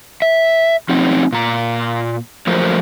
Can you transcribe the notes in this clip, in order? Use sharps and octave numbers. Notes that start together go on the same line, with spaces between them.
E5
F3 C4 C#4 D#4
A#2 A#5
F3 F#3 A3 A#4 C5